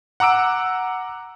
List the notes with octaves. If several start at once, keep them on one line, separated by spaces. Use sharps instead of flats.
F#5 A#5 D6 E6 D7